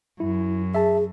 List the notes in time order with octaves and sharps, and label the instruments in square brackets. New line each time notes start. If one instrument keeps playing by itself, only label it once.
[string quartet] F#2 [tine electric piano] E4
[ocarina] G#4 [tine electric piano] E5 A5